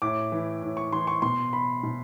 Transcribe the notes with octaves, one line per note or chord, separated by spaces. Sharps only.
A2 D6
E3
A2
C#6
E3 C6
C#6
B2 C6
B5
B2